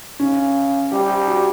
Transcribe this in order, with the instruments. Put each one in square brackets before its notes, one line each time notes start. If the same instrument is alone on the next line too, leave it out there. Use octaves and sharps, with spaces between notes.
[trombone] C#3 [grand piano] C#4
[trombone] G3 [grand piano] G4
[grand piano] G4
F#4